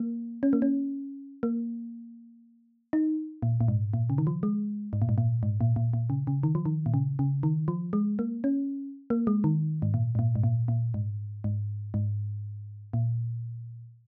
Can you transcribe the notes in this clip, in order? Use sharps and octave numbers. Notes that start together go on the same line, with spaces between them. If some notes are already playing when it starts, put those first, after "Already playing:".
Already playing: A#3
C#4
A#3
C#4
A#3
D#4
A#2
A#2
G#2
A#2
C#3
D#3
F3
G#3
G#2
A#2
G#2
A#2
G#2
A#2
A#2
A#2
C#3
C#3
D#3
F3
D#3
A#2
C#3
C#3
D#3
F3
G#3
A#3
C#4
A#3
G#3
D#3
G#2
A#2
G#2
A#2
G#2
A#2
A#2
G#2
G#2
G#2
A#2